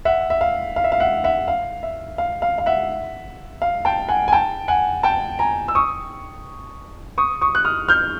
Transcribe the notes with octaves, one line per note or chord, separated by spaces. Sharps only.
E5 F#5
E5
F5
F5
E5
F5
E5 F#5
E5 F#5
F5
E5
F5
F5
F5
E5 F#5
F5
G5 A5
F#5 G#5
G#5
G5 A5
F#5 G#5
G5 A5
G#5 A#5
E6
C#6 D#6
C#6 D#6
C#6 D#6
F#6
D#6 F6
F6 G6